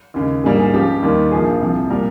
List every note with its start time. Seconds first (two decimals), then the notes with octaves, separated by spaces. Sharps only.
0.14 D#2 C#3 G#3
0.44 A#1 G#2 G3 A#3 G#4
0.59 G#4
0.73 C#2 C#3 F3 G4
1.03 D#2 D#3 G3 A#3
1.32 A#1 A#2 F3 A#3 G#4
1.61 C2 C3 F3
1.90 A#2 G3 A#3 A#4